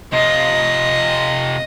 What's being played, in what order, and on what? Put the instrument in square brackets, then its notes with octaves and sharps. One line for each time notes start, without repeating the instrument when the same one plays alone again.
[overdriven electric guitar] C3 F4 [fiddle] D#5